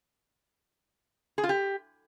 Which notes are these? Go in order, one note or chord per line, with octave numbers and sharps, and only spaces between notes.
G#4
F4
G4